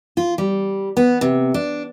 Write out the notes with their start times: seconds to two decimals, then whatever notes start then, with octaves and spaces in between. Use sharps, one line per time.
0.17 F4
0.38 G3
0.97 B3
1.21 C3
1.54 D4